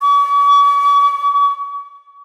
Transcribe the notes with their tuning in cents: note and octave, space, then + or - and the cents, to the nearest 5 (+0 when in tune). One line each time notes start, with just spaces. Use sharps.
C#6 +45